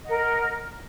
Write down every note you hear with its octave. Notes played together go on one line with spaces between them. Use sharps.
A#4 D#5 F#5